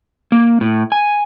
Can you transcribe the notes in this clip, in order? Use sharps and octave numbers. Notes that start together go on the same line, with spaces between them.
A#3
A2
G#5